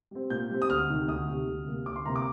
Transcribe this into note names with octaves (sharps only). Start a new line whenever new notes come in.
G3 C4
A#2 G6
G3 C4
D#6
D2 F6
C3 D#3 G3
D2 D#6
C3 D#3 G3
D2
C3 G3 A#3
D2 D6
C6
C3 G3 A#3 A#5
D6